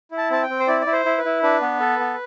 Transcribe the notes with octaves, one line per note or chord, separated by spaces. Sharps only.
E4
A5
C4 A5
G5
C4
C5
E4 D5
D5
E4
C5
E4
B4
E4
D4 B4
B3
A4
B3